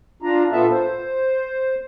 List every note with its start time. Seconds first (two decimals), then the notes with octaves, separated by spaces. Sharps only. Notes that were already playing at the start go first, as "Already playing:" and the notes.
0.22 D4 F4 A#5
0.52 A#2 B3 F4 A4 E5 A5
0.71 C5